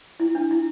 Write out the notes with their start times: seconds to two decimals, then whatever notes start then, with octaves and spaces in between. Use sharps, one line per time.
0.20 E4
0.35 D4
0.51 E4